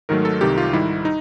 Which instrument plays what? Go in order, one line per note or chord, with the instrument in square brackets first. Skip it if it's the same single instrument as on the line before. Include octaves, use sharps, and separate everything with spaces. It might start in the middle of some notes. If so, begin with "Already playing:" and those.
[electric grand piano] G#2 D#3 F#3 A3 A#4
A4
C2 C3 D#3 G4
F4
G#2 D#3 G3 E4
D#4